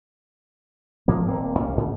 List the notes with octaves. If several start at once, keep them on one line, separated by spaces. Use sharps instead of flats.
G#2 F3 A#3
D#1 A#3 C4
C2 A#3 C#4
D2 G#2 D3